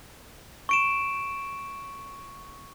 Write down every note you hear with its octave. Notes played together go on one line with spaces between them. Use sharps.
C#6 D7 E7